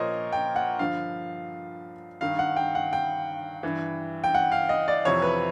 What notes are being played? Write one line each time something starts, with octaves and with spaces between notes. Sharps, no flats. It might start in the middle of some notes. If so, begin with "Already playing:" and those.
Already playing: A#2 F3 A#4 C5 C#5 D#5
G5
F#5
G2 D3 F3 F5
G2 D#3 F5
F#5
G5
F#5
G5
G2 E3
G5
F#5
F5
D#5
D5
F2 C3 E3 C#5
B4